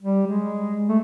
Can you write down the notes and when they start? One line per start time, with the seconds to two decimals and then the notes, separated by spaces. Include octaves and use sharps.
0.02 G3
0.27 G#3
0.89 A3